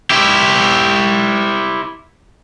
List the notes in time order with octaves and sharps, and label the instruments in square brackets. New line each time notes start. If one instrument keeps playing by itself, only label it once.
[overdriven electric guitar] E4 G4